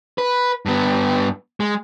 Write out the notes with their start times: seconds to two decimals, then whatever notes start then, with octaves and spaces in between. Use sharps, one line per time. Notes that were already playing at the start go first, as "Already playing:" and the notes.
0.18 B4
0.66 G2 B3
1.60 G#3